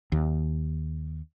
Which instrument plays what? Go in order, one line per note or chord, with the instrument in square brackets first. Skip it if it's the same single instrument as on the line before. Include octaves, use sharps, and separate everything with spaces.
[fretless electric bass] D#2